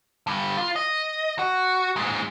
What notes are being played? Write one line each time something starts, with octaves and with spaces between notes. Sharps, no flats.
D3 G3
F4
D#5
F#4
A#2 G#3